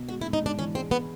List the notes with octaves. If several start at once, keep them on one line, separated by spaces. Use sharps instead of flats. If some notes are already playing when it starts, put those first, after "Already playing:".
Already playing: B2
G#3 F#4
E4
G#2
D#4
G#2 D4
E3 C#4
G#3 C4
B3